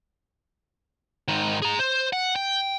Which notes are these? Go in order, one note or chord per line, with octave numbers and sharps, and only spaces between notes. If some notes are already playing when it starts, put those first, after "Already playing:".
G#2 D#3
G#4 A#5
C5
F#5
G5